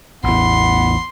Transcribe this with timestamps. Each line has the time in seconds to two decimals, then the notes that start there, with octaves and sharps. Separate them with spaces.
0.24 A1 E2 E3 B3 C6